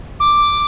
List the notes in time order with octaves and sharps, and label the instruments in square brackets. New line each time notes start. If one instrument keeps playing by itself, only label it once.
[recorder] D6